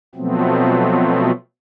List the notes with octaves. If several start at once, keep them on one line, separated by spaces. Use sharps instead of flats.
B2 F3 F#3 A3 B3 C4